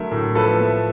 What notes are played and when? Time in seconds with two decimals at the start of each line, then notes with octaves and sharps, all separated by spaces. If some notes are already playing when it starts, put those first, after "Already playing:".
Already playing: D3 F#3 A3 A#4
0.11 A2
0.35 F3 A4 B4
0.60 A3